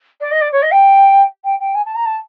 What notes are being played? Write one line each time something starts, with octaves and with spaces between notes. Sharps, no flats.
D5
D#5
D5
C#5
D#5
G5
G5
G5
G#5
A5
A#5
A5